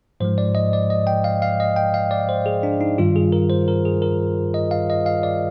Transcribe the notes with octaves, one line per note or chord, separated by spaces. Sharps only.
G#2 F3 G#3 C5
D5
D#5
D5
D#5
G5
F5
F5
D#5
G5
F5
D5
C5
G#4
D4
D#4
G2 D#3 G3 F4
G#4
A#4
C5
A#4
G#4
A#4
D#5
F5
D#5
F5
D5